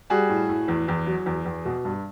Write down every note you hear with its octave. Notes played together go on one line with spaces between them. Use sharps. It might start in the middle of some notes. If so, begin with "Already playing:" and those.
G3 F#4 G#4
A2
A2
E2
E2
F#3
E2
E2
B2
G2